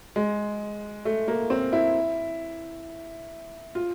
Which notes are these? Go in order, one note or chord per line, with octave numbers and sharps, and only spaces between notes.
G#3
A3
A#3
C4
E4
F4